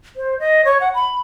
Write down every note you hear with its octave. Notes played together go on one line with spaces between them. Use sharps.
C5
D#5
C#5
F#5
B5